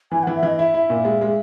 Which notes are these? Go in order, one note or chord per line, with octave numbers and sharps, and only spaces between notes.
E3 G#5
E3 F#5
E5
E3 D#5
E4 E5
E4
A#2
G#3
G#3